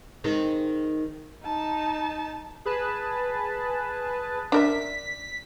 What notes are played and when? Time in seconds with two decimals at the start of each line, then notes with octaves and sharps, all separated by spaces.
0.24 D#3 G#3 C4
1.43 D#4 A5
2.65 G#4 B4 A5
4.52 D4 A#4 E5 B6